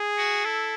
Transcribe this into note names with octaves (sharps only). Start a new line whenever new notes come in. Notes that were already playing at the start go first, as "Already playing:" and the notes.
Already playing: G#4
F#4
E4 A4